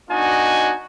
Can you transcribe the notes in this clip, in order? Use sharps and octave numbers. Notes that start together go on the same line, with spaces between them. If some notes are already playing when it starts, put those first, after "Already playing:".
B3 D4 D#4 F#4 D#5 G#5